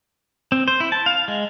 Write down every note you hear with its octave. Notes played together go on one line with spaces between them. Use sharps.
C4
C5
E4
A5
F5
G#3